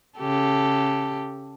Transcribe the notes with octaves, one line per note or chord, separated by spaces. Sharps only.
C#3 G4 A4